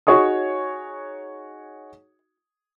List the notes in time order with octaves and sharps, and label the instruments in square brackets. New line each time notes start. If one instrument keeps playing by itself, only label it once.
[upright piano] D#4 F#4 G#4 C#5 C#6 D#6